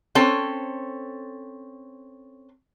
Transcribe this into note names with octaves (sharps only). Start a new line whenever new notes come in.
C4 C#4 A4